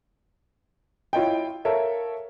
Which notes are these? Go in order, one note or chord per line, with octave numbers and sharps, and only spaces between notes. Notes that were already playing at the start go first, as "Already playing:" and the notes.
E4 F4 C#5 D#5 G5
A4 A#4 C#5 E5 F5